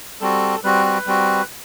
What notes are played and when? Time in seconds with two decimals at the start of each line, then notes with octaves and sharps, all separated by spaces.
0.21 G3 C4 F#4 A4
0.64 G3 C4 F#4 B4
0.85 B4
1.07 G3 C4 F#4